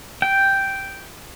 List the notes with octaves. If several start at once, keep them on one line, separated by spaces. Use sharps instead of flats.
G5